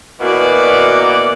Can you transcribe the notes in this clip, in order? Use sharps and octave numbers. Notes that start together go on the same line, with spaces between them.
B2 E3 A#3 F#4 D5